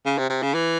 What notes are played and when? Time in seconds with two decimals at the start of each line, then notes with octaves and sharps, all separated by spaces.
0.06 C#3
0.18 C3
0.30 C3
0.43 C#3
0.55 E3